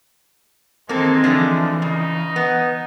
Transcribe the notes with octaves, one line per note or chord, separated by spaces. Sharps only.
D#3 G#3 A#3 C4 A4
D3 E3 F3 A3
C#3 D#4
B3